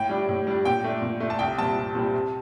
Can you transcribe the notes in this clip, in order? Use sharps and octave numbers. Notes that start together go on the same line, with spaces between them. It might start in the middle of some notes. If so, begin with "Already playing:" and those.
Already playing: A2 G5
G3 D4
A2
G3 D4
A#2 G5
A3 D4
A#2
A3 D4
A5
C2 G5
A#2 G3 C4 A5
C2
A#2 G3 C4
C3